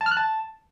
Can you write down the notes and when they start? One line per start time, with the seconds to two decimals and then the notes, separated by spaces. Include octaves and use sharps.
0.01 A5
0.06 F6
0.11 F#6
0.17 A5